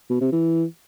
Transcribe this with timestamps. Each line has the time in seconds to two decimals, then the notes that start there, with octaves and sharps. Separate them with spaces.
0.10 B2
0.21 C3
0.32 E3